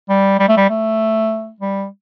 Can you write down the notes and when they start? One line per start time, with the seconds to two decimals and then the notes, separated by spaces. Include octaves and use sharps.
0.09 G3
0.39 G3
0.48 A3
0.57 G3
0.70 A3
1.60 G3